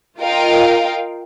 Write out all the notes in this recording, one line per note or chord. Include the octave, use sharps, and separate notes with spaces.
F4 A#4 D#5 F5 G5